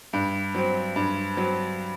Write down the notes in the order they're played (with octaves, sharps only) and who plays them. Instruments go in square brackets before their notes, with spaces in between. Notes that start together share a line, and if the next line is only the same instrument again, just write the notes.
[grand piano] G2
F#3 C4
G2
F#3 C4